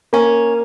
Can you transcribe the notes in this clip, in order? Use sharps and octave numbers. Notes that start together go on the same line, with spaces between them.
A#3 C#4